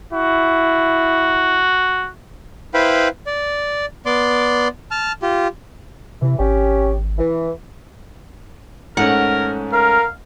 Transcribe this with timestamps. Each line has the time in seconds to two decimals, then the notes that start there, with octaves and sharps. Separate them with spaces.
0.13 E4 F#4
2.74 E4 B4 C5 F5 G5 B5
3.26 D5
4.06 B3 D5 C6 D6
4.91 A5 F6
5.22 F4 G4
6.22 C3 E3
6.39 G#1 C#4 G4
7.18 E3
8.97 G#2 A3 C#4 A#4 F#5
9.73 A#4 F5